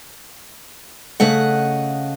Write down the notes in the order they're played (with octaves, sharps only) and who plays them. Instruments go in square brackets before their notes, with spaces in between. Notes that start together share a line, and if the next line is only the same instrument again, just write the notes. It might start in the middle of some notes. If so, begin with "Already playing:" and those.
[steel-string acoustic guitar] C#3 A3 D#5 F#5